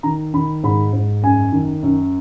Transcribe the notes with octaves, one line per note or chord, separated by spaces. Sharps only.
D#3 A#5
D#3 B5
G#2 B5
G#2
F#2 G#5
D#3
F#2